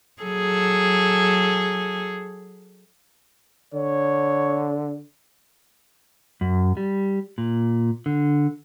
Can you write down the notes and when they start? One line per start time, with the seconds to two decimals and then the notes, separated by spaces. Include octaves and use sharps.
0.22 F#3 G#4 A4
3.74 D3 C#5
6.41 F#2
6.77 G3
7.38 A#2
8.06 D3